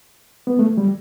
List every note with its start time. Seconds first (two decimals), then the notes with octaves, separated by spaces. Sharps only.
0.47 B3
0.59 A3
0.78 G3